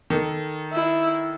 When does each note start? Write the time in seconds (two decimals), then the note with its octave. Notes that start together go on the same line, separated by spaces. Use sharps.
0.10 D#3 A4
0.73 E4